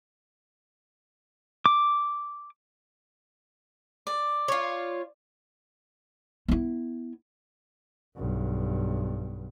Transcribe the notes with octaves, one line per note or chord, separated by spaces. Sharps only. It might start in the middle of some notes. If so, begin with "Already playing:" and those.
D6
D5
F4 C#5
B3 E4
B1 G2